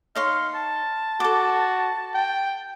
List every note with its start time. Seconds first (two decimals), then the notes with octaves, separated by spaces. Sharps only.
0.15 D#4 C#5 F5 C6
0.55 A5
1.20 F#4 A4 D6
2.14 G5